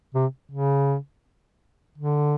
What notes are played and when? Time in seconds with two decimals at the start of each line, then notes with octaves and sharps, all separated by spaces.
0.15 C3
0.51 C#3
1.98 D3